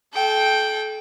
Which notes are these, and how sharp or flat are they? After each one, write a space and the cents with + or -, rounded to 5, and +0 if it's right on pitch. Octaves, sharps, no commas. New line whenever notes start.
A4 -35 G5 +0